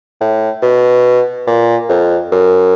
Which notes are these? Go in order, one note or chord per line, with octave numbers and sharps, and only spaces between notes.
A2
B2
A#2
F2
F#2